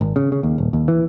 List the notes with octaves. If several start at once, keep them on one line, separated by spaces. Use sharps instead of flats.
G#1
C#3
C#3
D#2
D#1
D#2
E3